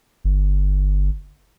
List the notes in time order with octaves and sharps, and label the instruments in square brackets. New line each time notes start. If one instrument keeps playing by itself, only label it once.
[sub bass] G1